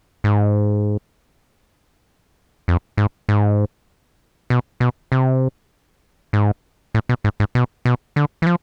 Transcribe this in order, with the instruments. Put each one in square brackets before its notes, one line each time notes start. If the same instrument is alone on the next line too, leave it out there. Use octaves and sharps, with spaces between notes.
[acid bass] G#2
F2
G#2
G#2
B2
B2
C3
G#2
A2
B2
G#2
G#2
B2
B2
D3
E3
F3